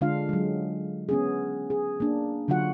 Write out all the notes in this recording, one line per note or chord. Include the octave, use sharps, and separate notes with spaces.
D3 G#3 D4 F4 F5
F#3 G#3
B3 C#4 G#4
G#4
A#3 D4
D3 F#3 F4 F#4 F#5